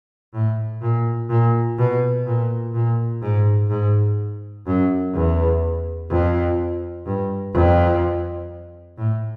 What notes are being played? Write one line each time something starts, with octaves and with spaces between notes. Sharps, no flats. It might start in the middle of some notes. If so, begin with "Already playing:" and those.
A2
A#2
A#2
B2
A#2
A#2
G#2
G#2
F#2
E2
F2
G2
F2
A2